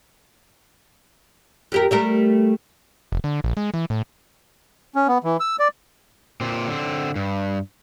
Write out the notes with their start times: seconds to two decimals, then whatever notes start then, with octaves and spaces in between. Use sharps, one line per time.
1.72 F2 G4 A#4
1.91 G3 A3 A#4
3.12 F1
3.24 D3
3.44 A#1
3.57 G#3
3.74 E3
3.90 A2
4.95 C#4
5.08 B3
5.24 E3
5.40 E6
5.59 D5
6.41 A#2 C4
6.68 D3 C4
7.16 G2